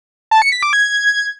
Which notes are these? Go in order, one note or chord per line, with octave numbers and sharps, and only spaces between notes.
A5
C#7
B6
D6
G#6